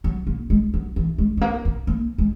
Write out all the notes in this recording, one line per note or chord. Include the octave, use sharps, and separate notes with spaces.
F#3
A#3
G#3
F#3
E3
G#3
G#3
A#3
B3
A#3
G#3